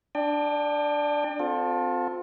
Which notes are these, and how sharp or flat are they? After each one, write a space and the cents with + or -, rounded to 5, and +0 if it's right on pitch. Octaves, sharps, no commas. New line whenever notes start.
D4 +0 D5 +45 G5 +30
C4 -20 F4 +30 A4 +0